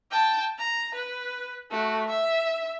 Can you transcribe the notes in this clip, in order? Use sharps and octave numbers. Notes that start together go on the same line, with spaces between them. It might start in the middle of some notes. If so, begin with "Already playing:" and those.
G5 A5
A#5
B4
A3 F#4
E5